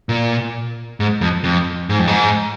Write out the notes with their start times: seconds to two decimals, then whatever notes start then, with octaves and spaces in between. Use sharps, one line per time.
0.09 A#2
1.00 G#2
1.21 F2
1.44 F2
1.89 G#2
1.99 F2
2.08 G#2